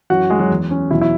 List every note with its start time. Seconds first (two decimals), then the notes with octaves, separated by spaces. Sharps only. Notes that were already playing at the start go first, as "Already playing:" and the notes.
0.10 F#2 E3 F#4 F#5
0.30 G#3 G#4
0.39 F#3 F#4
0.50 E2 E3
0.71 C#4
0.91 E2 B2 F#3 E4
1.01 E4